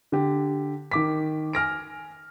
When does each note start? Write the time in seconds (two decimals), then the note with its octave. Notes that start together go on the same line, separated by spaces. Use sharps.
0.12 D3 G4
0.91 D#3 D6 B6
1.53 G#5 F6 A#6 D7